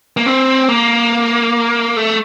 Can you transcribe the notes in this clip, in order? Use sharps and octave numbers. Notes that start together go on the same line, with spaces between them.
A#3
C4
A#3
A3